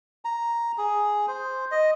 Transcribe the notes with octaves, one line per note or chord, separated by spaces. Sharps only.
A#5
G#4
C5
D#5